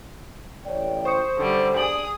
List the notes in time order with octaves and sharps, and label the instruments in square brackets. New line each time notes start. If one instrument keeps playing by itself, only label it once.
[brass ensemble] A1 G5 [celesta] C#5 D5
[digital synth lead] C5 [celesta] C#6 D#6 C#7
[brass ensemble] F#2 [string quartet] D3 G3
[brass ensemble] D4 [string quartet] G#4 D#6 [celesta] G#5 D7 F#7